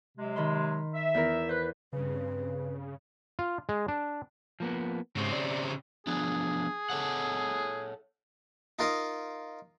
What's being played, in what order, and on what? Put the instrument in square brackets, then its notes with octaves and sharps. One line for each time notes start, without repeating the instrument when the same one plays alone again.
[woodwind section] C3 F#3 G#3
[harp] D#3 B5 C6
[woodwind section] E5
[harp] E2 E4 A#4
[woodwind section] B4 [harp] C5
[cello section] G2 C4 [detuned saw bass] C#3 [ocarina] B4
[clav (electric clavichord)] F4
G#3
D4
[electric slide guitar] F3 A#3 B3
[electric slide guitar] G#2 [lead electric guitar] C#3 C4
[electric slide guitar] D5
[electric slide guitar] F3 B3 D4 [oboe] G#4
[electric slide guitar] A4 C#5 F#5
[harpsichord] D#4 F4 A#4 D#5 F5